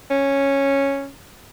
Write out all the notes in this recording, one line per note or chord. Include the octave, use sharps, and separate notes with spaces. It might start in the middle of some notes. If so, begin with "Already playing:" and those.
C#4